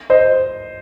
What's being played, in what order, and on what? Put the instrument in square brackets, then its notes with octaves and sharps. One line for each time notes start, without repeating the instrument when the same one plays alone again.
[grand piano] C5 D#5